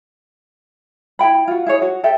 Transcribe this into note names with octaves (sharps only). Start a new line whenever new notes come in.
E4 E5 G5 B5
F4 F#4
E4 G#4 C#5 D#5
F#4
G4 A4 E5 G5